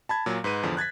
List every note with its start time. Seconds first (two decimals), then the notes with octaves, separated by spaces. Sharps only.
0.09 A5 B5 G#6
0.26 A#2 F#3
0.44 G#2 B4 D#7
0.63 E2 D3 F3
0.77 F#6 G#6 A6 B6